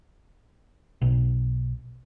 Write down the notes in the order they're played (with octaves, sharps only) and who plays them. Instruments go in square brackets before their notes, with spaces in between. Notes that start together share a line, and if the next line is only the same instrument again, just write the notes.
[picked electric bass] B1